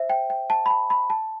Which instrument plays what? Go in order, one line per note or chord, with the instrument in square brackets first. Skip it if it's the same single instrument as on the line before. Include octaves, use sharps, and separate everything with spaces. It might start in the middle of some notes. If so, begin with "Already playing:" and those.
Already playing: [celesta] C5 E5
G5
G5
A5
B5
A5
B5
A5